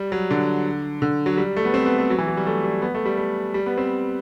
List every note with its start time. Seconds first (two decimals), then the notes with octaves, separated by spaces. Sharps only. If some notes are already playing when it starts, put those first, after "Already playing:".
Already playing: G3
0.12 F#3
0.31 D3
1.02 D3
1.26 F#3
1.38 G3
1.56 A3
1.65 B3
1.74 C4
1.86 B3
1.98 A3
2.10 F#3
2.18 E3
2.28 F#3
2.37 G3
2.47 A3
2.64 G3
2.82 B3
2.95 A3
3.05 G3
3.17 A3
3.54 G3
3.66 B3
3.78 C4